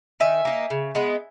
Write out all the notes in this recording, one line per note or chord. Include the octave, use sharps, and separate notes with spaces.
D#3 E5 G#5
A#3 D#4
C#3
G#3 B3